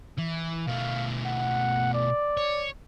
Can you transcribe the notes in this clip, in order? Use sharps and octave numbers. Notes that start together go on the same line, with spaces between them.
E3
B2 A3 F5
F#5
D5
C#5